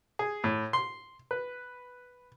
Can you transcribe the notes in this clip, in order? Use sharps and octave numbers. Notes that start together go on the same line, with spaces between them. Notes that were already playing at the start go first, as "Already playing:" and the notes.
G#4
A2
C6
B4